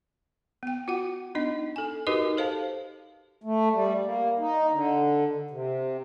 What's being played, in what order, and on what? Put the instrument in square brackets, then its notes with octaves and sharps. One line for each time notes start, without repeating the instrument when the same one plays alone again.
[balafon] B3 G5
F4 F#4 F#5
B3 D4 D#4 D#5
A4 G#5
D#4 F#4 G4 A#4 B4 D#5
A4 C5 F5 A5
[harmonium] A3
G3
A#3
D#4
D3
C3